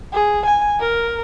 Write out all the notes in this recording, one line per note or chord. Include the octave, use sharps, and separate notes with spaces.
G#4
G#5
A#4